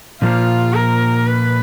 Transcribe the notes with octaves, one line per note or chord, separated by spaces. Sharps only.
A#2 F3 A#3 F4
A#4
B4